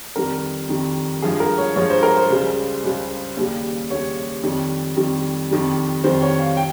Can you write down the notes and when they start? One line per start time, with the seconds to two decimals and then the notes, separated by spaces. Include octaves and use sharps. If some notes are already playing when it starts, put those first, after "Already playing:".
0.16 F2 D#3 G3 A#4
0.69 F2 D#3 G3
1.22 G2 F3 G#3 G#4
1.40 A#4
1.58 C#5
1.76 G2 F3 G#3 C#5
1.90 C5
2.03 A#4
2.17 C5
2.30 C#2 C#3 G3
2.84 C#2 C#3 G3
3.37 D#2 C#3 G3
3.90 D#2 C#3 G3 C#5
4.43 F2 D#3 G3
4.96 F2 D#3 G3
5.51 F2 D#3 G3
6.04 F2 D#3 G3 C5
6.22 C#5
6.40 F5
6.57 G5